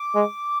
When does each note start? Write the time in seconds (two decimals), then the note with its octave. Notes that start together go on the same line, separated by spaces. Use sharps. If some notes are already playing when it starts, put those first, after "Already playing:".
Already playing: D6
0.15 G#3